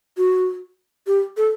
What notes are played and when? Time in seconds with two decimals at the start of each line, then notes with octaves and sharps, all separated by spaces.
0.18 F#4
1.07 G4
1.37 A4